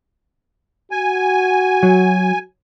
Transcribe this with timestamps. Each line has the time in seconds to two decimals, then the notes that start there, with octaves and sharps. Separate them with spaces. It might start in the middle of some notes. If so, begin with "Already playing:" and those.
0.92 F#4 G#5
1.83 F#3